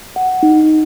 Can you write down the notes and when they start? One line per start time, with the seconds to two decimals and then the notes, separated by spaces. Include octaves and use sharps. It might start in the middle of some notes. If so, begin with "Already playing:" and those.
0.16 F#5
0.43 D#4